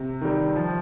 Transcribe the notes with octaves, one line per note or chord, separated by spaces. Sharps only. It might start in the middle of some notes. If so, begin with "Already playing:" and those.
Already playing: C3
D#3 G3
F3